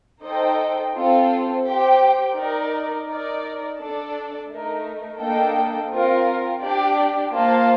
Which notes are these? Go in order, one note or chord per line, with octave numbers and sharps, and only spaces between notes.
D#4 A4 C5 D#5 G5
C4 F4 A4
G4 C5 G5
D#4 A#4 D5
D#4 A#4 D5
D4 A4 D5 A5
A3 D#4 A#4
A#3 D4 A4 D#5 G5
C4 F4 A#4
D4 G4 D5
A#3 F4 C5 F5 A5